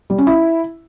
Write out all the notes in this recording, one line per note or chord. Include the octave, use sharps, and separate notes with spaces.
G3
C#4
E4